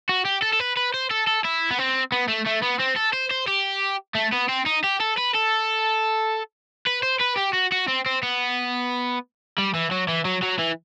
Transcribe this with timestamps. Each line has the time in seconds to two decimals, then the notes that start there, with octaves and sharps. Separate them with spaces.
0.09 F#4
0.25 G4
0.42 A4
0.53 A4
0.60 B4
0.77 B4
0.94 C5
1.11 A4
1.28 A4
1.45 E4
1.70 B3
1.79 C4
2.12 B3
2.28 A3
2.47 A3
2.63 B3
2.80 C4
2.97 A4
3.13 C5
3.31 C5
3.48 G4
4.15 A3
4.33 B3
4.49 C4
4.66 D#4
4.84 G4
5.00 A4
5.18 B4
5.34 A4
6.86 B4
7.03 C5
7.21 B4
7.37 G4
7.54 F#4
7.72 F#4
7.88 C4
8.06 C4
8.23 B3
9.58 G3
9.74 E3
9.91 F#3
10.08 E3
10.25 F#3
10.43 F#3
10.59 E3